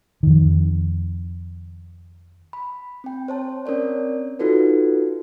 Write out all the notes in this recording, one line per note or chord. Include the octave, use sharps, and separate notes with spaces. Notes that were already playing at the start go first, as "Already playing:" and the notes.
F2 D#3
B5
C4 G5
C5 C#5 A5
C4 C#4 A#4 C#5 D5
D#4 F4 F#4 A4 B4